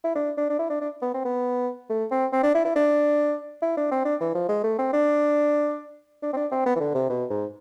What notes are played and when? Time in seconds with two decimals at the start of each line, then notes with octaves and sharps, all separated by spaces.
0.04 E4
0.15 D4
0.37 D4
0.50 D4
0.59 E4
0.70 D4
0.81 D4
1.02 B3
1.14 C4
1.25 B3
1.90 A3
2.11 C4
2.32 C4
2.43 D4
2.55 E4
2.65 E4
2.76 D4
3.62 E4
3.77 D4
3.91 C4
4.05 D4
4.20 E3
4.35 F3
4.49 G#3
4.64 A3
4.78 C4
4.93 D4
6.22 D4
6.33 C4
6.37 D4
6.52 C4
6.66 B3
6.76 E3
6.80 D3
6.95 C3
7.10 B2
7.30 G#2